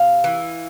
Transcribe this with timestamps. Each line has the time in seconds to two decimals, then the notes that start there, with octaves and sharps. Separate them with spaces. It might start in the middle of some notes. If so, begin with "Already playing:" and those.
Already playing: C3 F5
0.24 E3